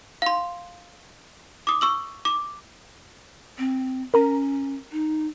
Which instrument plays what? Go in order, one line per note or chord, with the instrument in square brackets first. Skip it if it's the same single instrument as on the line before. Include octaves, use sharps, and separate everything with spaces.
[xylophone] F5 C6
D6 D#6
C#6 E6 F#7
D6
[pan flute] C4
[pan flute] C#4 [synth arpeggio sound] A#4 A#5
[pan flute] D#4